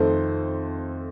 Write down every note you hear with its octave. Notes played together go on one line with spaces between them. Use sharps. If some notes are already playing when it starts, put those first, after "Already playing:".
Already playing: F2 D#3 A3 C4 A4 C5